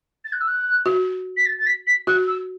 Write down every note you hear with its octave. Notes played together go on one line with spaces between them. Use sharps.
A6
F#6
E6
F#6
F#4
B6
A6
A6
B6
B6
F#4 F#6
E6